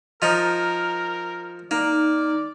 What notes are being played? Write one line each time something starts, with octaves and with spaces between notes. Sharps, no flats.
F3 D#4 A#4
A#3 D#4 D5